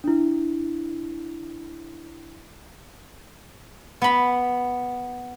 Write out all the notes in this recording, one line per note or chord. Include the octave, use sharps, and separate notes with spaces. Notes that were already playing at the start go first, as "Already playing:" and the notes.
D4 E4
B3 B5